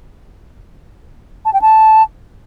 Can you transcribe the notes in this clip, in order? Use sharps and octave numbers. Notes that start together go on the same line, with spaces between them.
A5
G5
A5